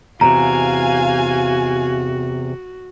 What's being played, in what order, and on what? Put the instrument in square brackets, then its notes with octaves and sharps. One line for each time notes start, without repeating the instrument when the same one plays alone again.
[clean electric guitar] E2 A2 C3 [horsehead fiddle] F#4 [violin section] F5 G#5 [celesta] A#5